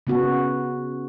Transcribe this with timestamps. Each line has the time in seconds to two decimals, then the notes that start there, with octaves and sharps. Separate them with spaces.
0.07 C#3 B3 F#4